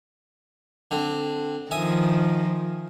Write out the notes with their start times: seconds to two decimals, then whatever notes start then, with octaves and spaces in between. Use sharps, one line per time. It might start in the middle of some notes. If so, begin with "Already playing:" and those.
0.91 D3 C4
1.71 D#3 F3 E5 G#5 D#6